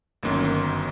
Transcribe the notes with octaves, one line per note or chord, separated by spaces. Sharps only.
G1 F#2 D#3 F#3 A#3